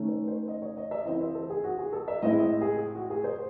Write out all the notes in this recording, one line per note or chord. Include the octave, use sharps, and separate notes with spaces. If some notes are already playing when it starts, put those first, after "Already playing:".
Already playing: D#3 A3 C#4
C5
C5
D#5
C#5
D#5
E5
E3 C4 E4 D#5
C5
A4
G#4
F#4
G#4
A4
E5
A2 G#3 C4 E4 D#5
D#5
G#4
F#4
G#4
C5